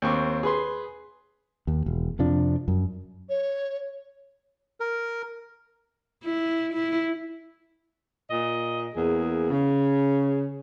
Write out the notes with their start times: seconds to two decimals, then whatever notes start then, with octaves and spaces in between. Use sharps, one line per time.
0.02 D#2 C4 C#6 D6
0.43 G#4 B4 C6
1.67 D#2
1.86 E1
2.19 F2 C3 F3 D4
2.68 F#2
3.29 C#5
4.80 A#4
6.24 E4
6.73 E4
8.30 A#2 D#5
8.94 E2 A#3 G#4
9.50 C#3